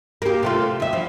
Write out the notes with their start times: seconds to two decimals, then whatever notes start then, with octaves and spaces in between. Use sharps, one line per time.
0.22 A#3 G4
0.43 C3 A3 F4
0.80 D#2 E5
0.92 E2 F3